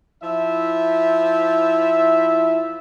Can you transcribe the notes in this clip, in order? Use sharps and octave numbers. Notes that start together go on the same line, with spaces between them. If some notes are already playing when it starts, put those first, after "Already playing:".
F3 E4 E5